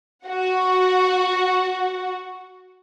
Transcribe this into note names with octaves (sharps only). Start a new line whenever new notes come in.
F#4 F#5